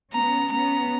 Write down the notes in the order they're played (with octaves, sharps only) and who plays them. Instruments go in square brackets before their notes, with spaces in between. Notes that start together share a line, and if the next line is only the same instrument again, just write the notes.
[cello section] B3 C#4 [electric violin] A#5
[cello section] B3 C#4 [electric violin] A#5